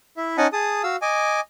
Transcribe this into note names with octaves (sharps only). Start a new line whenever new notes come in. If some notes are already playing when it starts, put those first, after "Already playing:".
E4 E5
C#4 D#4 D#5 F#5 G#5 A5
G#4 A5 D#6
F#4 F5 E6
D#5 G#5 D6